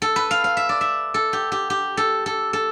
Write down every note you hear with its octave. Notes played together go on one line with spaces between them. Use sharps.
A4
B4
F5
F5
E5
D5
E5
A4
G4
G4
G4
A4
A4
A4